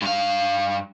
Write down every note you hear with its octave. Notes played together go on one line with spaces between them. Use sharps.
G2 F5